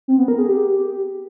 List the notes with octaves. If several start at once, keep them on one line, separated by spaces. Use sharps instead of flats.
C4
B3
A#4
G#4
G4